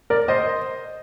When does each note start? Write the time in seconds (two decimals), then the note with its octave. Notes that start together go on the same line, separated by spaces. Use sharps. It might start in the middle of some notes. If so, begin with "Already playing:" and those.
0.10 A#4 D5
0.28 C5 D#5